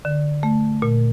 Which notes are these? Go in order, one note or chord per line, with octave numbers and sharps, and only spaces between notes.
D3
A3
A#2